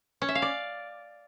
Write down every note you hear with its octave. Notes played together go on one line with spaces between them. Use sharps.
C#4
E5
F5
D5